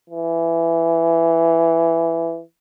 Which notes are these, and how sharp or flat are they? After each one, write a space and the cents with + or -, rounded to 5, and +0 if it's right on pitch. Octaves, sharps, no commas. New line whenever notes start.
E3 +10